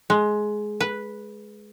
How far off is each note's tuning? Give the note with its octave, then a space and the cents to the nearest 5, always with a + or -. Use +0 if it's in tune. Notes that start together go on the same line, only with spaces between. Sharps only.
G#3 +15
B4 -5